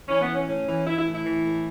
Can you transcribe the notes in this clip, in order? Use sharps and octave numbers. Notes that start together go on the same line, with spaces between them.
E3 C#4
B3
E3
C#4
A2 C#4
E3
E3 E4
E4
A2
E4
E3
A2